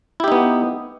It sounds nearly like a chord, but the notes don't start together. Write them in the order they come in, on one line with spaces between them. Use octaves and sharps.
E4 G4 D#4 B3